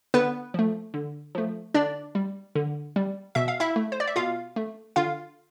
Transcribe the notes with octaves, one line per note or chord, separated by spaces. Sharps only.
D3 B3 B4
F3 A3
D3
F3 A3
D3 D4 D5
G3
D3
G3
B2 E5
F5
E4 E5
A3
C5
D5
E5
B2 F4 F5
A3
D3 F4 F5